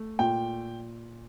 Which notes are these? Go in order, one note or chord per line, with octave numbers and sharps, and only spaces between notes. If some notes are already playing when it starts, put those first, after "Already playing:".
Already playing: A3
A#2 G5